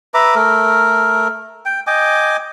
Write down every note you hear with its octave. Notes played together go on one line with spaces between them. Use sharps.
B4 E5 A#5 D6
A3 A#4
G5
D#5 G5 G#5 D6